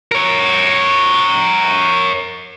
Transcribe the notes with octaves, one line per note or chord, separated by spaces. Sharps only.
A#4 C#5